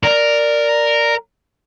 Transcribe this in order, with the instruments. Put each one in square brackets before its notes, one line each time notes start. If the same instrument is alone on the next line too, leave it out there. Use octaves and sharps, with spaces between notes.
[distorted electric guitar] A#4 [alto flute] D5